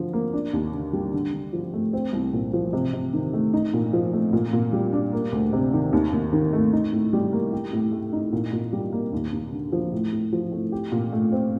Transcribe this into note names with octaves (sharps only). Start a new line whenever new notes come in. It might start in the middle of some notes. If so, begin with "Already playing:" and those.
Already playing: D3 F3
A#3
D4
D#2
D3
G3
D3
D3
F3
A3
C4
C2
A#2
F3
C3
C3
D#3
A3
D#4
A#2
F3
A3
A#2
A#2
G3
D4
A#3
D2
C3
D#3
D#2
D#2
D#3
A3
D#4
A2
G3
A#3
G4
A2
A3
D#4
A#2
A#2
G3
A#3
D#2
D#2
D3
F3
A2
A2
F3
A3
G4
A#2
A3
C4